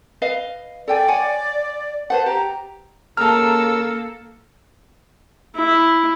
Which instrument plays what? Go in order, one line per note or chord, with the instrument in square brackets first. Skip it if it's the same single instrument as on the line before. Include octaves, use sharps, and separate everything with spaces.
[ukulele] B4 D#5 F5
[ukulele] A4 G5 G#5 [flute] D5
[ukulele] C#5 F#5 G#5
[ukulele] B4 C5 F#5 [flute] A5
[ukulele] G4 [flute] A#5
[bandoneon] C#3 A#4 E6 [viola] A#3 A4 [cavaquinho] A5 A#5 [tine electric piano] F6
[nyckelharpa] E4